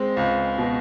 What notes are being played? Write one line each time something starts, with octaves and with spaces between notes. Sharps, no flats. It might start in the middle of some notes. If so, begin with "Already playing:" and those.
Already playing: G#3 C4
C#2
B2